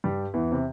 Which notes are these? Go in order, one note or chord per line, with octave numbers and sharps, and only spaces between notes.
G2 G3
E2 E3
C3